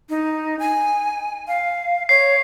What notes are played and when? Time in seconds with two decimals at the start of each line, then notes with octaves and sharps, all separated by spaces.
0.09 D#4
0.59 G#5
1.48 F5
2.09 C#5 C7